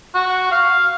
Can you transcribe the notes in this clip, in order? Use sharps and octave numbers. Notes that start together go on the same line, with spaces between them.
F#4
F5